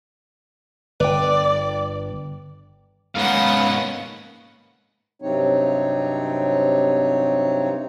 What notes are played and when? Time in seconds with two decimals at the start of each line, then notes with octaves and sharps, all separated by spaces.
1.00 G1 B4 D5 G5
3.15 G#2 A#3 B3 C#4 F5 F#5
5.22 G2 C3 F#3 C4 D#4 C#5